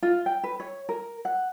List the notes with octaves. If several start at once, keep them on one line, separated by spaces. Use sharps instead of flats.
F4
G5
B4
C#5
A#4
F#5